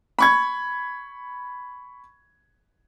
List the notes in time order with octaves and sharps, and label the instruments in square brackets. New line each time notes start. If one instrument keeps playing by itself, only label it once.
[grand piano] B5 C#6 G#6